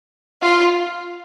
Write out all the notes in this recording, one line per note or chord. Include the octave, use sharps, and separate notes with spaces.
F4